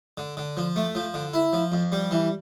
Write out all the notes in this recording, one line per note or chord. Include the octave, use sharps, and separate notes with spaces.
D3
D3
F3
A3
F3
D3
E4
F3
F2
G3
E3